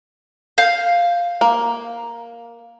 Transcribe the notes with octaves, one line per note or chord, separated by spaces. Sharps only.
F5 G6
A#3